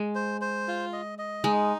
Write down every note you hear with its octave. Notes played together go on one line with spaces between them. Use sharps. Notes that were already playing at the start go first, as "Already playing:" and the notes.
Already playing: G#3
C5
C5
F4
D#5
D#5
G#3 D#4